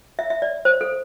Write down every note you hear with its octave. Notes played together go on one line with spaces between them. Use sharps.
E5
E5
D5
C5
A4